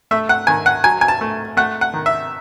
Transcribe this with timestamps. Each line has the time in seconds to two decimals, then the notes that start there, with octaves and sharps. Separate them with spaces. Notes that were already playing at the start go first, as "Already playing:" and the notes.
0.11 A3 E5
0.29 F#5
0.47 D#3 G#5
0.66 F#5
0.84 F#3 G#5
1.01 G#5
1.08 A5
1.21 A3
1.57 A3 F#5
1.81 F#5
1.94 D#3
2.06 E5